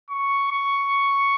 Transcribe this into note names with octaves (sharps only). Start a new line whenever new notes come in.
C#6
C#6